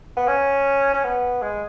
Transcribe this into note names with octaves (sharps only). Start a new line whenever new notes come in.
B3
C#4
C#4
B3
G#3